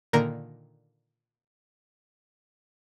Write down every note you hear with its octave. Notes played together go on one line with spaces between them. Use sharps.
A#2 D3 D#3 A#3 A#4 A#5